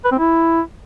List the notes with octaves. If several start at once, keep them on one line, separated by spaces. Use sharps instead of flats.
B4
C4
E4